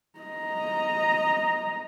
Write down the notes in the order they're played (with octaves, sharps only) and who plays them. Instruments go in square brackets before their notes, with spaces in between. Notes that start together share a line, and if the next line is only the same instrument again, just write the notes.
[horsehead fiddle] D#5 A#5